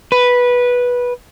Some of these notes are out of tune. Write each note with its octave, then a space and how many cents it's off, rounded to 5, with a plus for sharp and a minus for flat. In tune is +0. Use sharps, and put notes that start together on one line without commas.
B4 -10